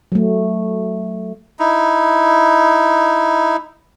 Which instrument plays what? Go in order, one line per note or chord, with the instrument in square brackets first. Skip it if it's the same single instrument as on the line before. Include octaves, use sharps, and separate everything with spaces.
[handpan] F#3 A3
[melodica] D#4 E4